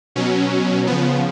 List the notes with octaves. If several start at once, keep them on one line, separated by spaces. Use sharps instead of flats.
B2 F#3 C#4
C#3 F3 B3